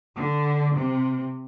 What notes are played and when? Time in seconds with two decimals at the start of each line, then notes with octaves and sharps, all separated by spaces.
0.15 D3
0.75 C3